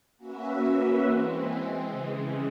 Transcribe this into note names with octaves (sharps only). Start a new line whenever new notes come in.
A#3 C#4 F#4 B4 E5
E3 G#3 C4
C#3 E3 G#3